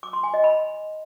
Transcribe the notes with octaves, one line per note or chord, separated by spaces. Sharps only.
D6
C6
G#5
D#5
B5